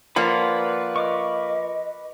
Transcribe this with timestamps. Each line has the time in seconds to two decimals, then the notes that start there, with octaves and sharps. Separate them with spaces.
0.16 F3 A#3 B4 D5 F#5 B5
0.96 D#5 C#6 D6 F6